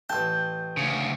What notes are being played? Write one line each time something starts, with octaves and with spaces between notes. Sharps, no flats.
A1 G5 A5
D2 C#3